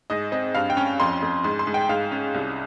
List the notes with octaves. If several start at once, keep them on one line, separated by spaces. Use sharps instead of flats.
G#2 D#5
C4 D#5
G2 F5
G5
C#4
F2 C6
F2
G#2 C6
C6
G#2
G5
G#2 F5
C#4
C2